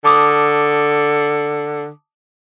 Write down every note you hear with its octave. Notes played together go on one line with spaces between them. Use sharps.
D3 A5 D6 D#6